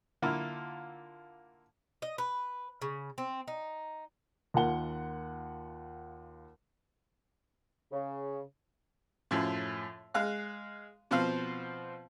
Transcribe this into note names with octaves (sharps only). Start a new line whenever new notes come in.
D3 A#3 E4 F4
D#5
B4
C#3
C4
D#4
D#2 F4 A#4 F#5 G7
C#3
F#2 A2 F3
G#3 F5 F#6
B2 F3 C4 C5 F5